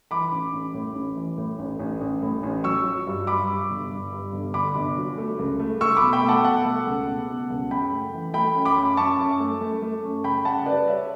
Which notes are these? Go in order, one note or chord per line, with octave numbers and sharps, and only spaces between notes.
E3 B5 D6
A1
A1
A2
A1
E3
A2
A1
A1
A1
A2
A1
F#3 C#6 E6
F#3
G2
G2 B5 D6
G2
G1
G2
G2
G1
D3 B5 D6
G1
F#3
A3
C#2
A3
A3 C#6 E6
B5 D6
B2
G5 B5
A3
F#5 A5
B2 F#5 A5
A3
C#2
B2
B2
C#2
F#2 G5 B5
A3
E3
A3 G5 B5
F#2
B5 D6
F#2
F#2 A5 C#6
F#2
A3
A3
A3
F#2
C#3 G5 B5
C#3 F#5 A5
G3 B4 D5
G3 C#5 E5